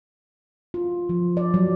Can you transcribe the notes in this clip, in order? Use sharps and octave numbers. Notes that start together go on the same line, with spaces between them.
F4
F3
D5
F#3